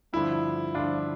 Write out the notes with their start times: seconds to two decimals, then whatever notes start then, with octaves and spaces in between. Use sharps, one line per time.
0.13 G2 D3 F3 E4
0.74 G2 D3 F3 D4 F4